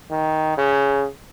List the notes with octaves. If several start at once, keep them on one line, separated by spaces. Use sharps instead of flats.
D#3
C#3